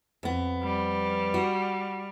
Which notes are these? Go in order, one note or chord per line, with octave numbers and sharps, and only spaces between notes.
F2 B3
G3
F#4